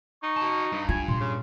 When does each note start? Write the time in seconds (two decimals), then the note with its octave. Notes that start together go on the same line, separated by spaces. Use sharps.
0.23 D#4 C#6
0.36 F#4 A5
0.72 G2
0.89 F4 G#5
1.08 A#2 C6
1.21 C#3